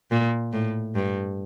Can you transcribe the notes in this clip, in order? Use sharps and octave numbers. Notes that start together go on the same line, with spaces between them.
A#2
A2
G2